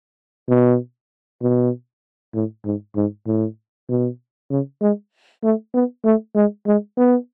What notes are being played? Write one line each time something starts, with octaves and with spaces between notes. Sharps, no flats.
B2
B2
A2
G#2
G#2
A2
B2
C#3
G#3
A3
B3
A3
G#3
G#3
B3